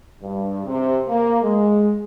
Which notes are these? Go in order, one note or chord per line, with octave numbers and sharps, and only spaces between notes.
G2
C3
A#3
G#3